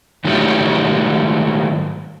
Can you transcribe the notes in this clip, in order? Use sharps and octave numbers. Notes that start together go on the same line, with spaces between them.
G#2 D#3 F#3 G3 A3